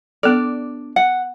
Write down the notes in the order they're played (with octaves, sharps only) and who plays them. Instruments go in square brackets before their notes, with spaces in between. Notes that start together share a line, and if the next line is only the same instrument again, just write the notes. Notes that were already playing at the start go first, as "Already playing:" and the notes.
[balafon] B3 A4 [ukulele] D4 D5
[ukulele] F#5